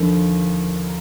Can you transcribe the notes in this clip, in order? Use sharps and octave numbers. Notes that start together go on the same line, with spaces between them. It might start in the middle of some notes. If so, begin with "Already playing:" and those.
Already playing: D#2 D3 F3
A#3